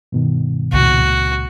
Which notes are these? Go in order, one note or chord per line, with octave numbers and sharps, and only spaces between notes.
G2 B2 D#3
C#2 A#2 F#4